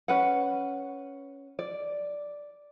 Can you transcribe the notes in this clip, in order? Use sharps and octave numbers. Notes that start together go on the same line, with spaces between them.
C#4 B4 F#5
D5